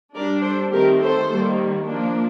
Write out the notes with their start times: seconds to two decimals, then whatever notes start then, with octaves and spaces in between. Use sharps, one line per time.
0.15 G3 D4 A#4 D5
0.43 A4 C5
0.72 D#3 A3 C4 G4 A#4
1.01 A4 C5
1.29 D#3 G3 A#3
1.86 F3 A#3 D4